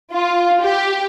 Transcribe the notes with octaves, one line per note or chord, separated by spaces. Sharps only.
F4
G4